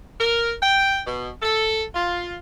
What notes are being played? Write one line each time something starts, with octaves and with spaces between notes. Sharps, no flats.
A#4
G5
B2
A4
F4